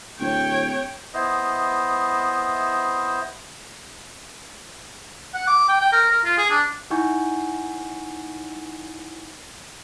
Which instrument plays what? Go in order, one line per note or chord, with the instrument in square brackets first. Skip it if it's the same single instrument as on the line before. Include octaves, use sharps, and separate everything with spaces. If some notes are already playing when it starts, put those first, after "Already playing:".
[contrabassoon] D1 [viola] C#5 G5
[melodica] B3 E4 C5 D#5
[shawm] F#5
D6
G5
G5
A#4
A#4
F4
G#4
D4
[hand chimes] D#4 E4 F#5 G#5 C#6 G6